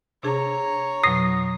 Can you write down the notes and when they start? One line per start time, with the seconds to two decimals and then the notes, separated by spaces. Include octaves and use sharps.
0.23 C3 D4 G#4 C#5 A#5
1.04 F2 B2 F#3 D#6 A#6 C7